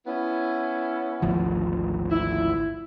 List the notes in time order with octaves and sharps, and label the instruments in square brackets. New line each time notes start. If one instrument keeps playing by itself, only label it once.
[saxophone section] B3 C#4 E4
[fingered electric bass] G#1 D2 F3
[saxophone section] E4